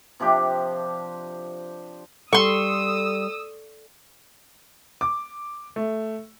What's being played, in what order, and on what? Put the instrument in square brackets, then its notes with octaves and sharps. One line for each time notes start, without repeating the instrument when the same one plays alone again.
[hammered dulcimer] C3 F3 D4 G4
[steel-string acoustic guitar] G3 [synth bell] A4 [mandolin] C6 C#6 [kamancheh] D#6 E6
[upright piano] D6
A3